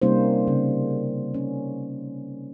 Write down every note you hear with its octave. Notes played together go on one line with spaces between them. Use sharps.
C3 G3 A#3 C#4 D#4 C5
C#3
C#4